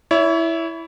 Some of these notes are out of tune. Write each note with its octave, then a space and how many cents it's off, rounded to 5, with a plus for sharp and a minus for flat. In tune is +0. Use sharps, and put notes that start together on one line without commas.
E4 +0 C#5 +35